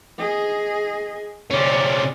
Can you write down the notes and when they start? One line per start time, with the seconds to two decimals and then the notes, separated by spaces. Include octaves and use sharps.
0.19 G#4 D#5
1.51 C3 C#4 D5